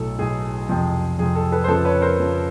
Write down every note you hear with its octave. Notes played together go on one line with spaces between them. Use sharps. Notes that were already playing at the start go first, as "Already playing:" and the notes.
Already playing: B1 A2 F#3 A4
B1 A2 F#3 G#4
F2 C3 F3
F2 C3 F3 G#4
A4
A4 B4
C5
F2 C#3 F3 A4 B4
B4 C#5
A#4 C5
F2 C#3 F3